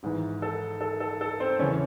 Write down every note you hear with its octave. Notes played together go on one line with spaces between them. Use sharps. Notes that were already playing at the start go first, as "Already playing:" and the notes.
G#1 G#2 E3
A4
A4
A4
A4
C4 C5
E2 C#3 E3 C#4 C#5